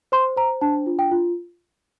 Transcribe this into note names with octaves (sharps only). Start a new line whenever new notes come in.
C5 C6
C5 A#5
D4 A5
F4
G5
F4